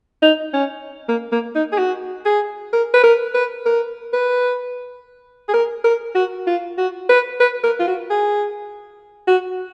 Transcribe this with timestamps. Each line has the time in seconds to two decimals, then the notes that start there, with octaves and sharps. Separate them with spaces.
0.22 D#4
0.54 C#4
1.09 A#3
1.32 A#3
1.55 D#4
1.72 G#4
1.78 F#4
2.25 G#4
2.73 A#4
2.94 B4
3.04 A#4
3.35 B4
3.66 A#4
4.13 B4
5.49 G#4
5.53 A#4
5.84 A#4
6.15 F#4
6.47 F4
6.78 F#4
7.09 B4
7.40 B4
7.64 A#4
7.80 F4
7.88 F#4
8.10 G#4
9.28 F#4